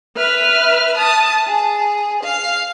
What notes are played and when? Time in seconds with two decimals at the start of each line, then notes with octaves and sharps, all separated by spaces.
0.16 B4 E5 F6
0.96 A5 D#6
1.47 G#4
2.24 F5